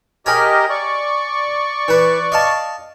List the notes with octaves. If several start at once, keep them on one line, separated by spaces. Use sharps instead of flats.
G4 G#4 A#4 C#5 D#5
D5 C#6
E3 B4
D#5 F5 A5